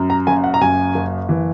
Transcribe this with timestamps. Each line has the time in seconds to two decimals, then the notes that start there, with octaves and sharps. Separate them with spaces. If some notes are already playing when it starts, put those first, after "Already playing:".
Already playing: F#2
0.10 A#5
0.27 F#1 G#5
0.44 F#5
0.54 A#5
0.61 F#2 G#5
0.95 F#1
1.29 E3